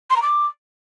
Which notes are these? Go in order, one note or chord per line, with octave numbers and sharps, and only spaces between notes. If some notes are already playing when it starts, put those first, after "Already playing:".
C6
A#5
D6